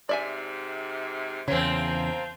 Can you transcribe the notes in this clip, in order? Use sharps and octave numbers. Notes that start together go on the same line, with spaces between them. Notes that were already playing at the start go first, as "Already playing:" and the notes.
G#2 C3 D5 E5 G#5
E2 C#3 F3 A#3 C4 C5 C#5